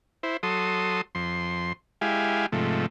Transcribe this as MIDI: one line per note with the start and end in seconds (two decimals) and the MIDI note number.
0.23 0.37 64
0.23 0.37 72
0.43 1.01 54
0.43 1.01 69
0.43 1.01 84
0.43 1.01 87
1.15 1.73 41
1.15 1.73 84
2.01 2.46 56
2.01 2.46 64
2.01 2.46 67
2.01 2.46 77
2.01 2.46 80
2.52 2.86 44
2.52 2.86 48
2.52 2.86 53
2.52 2.86 57